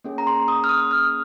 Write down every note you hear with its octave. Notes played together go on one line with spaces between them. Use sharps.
A#3 C#4 G#4
A#5
C6
D#6
F6
D#6
F6